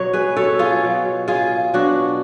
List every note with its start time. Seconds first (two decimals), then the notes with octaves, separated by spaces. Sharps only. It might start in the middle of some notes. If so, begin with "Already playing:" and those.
Already playing: B2 F#3 C#5
0.13 G#4 B4
0.37 A4 C#5
0.59 F4 G#4
0.83 B2 F#3
1.28 F4 G#4
1.74 B2 F#3 D4 F#4